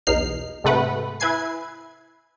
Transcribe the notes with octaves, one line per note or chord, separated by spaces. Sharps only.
B1 E2 D#4 F6 C7
G#2 C3 A3 B4 F#5
E4 B4 G#5 G#6 C7